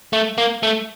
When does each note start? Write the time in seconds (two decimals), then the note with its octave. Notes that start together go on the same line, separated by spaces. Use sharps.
0.13 A3
0.38 A#3
0.63 A3